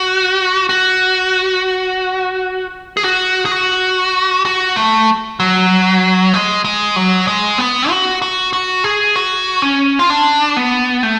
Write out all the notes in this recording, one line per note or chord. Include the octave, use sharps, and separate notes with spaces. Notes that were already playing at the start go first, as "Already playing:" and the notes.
Already playing: F#4
F#4
G#4
F#4
G#4
F#4
F#4
A3
F#3
G#3
G#3
F#3
G#3
B3
F#4
F#4
F#4
G#4
F#4
C#4
F4
D4
B3
A3